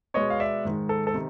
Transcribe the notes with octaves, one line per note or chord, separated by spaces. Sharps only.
B2 G#3 B3 C#5 D#5
F5
D5 E5
G#2 D#3 G#3
A4
A4
C3 D#3